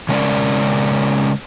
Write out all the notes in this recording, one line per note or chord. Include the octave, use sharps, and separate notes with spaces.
C#3 G#3 C#4 A4 A#4 D5